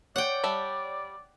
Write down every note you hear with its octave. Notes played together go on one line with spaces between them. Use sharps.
C#5 D5 F#5 G5
G3 E5 A5